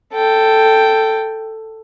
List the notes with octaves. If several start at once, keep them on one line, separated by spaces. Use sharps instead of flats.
A4 G5